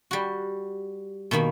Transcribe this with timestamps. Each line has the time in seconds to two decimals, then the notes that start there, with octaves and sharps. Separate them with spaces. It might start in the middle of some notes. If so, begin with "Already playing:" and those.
0.11 G3 F#4
1.31 B2 D#3 A#3 B5